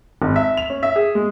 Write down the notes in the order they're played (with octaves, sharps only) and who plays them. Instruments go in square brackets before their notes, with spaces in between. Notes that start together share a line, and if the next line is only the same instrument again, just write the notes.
[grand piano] G#1
E5
F7
C#4
E5
G#4
G#3